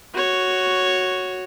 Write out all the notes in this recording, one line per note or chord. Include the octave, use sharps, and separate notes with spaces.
F#4 C#5